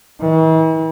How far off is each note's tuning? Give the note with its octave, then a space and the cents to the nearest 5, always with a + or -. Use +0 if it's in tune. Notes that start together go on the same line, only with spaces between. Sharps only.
E3 -45